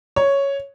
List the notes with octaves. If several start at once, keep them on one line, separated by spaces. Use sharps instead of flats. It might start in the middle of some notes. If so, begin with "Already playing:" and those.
C#5